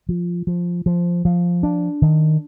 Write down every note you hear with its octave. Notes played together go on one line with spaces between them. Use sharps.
F3
F3
F3
F3
D4
D#3